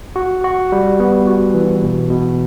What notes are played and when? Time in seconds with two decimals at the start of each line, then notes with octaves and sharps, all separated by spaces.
0.16 F#4
0.44 F#4
0.72 G3
1.00 B3
1.27 F#4
1.54 E3
1.83 B2
2.10 B2